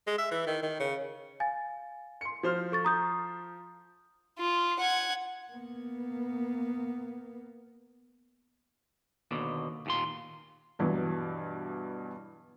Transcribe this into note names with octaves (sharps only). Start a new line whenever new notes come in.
G#3
E5
E3
D#3
D#3
C#3
F5 G#5 A6
C6 C#7
F3 F#4 C5 F6
A4 C#6 A6
A#5 D#6 G6
F4
F#5 G#6
A#3 B3
D#2 B2 D3
D#2 A#2 C6
G2 B2 E3 F#3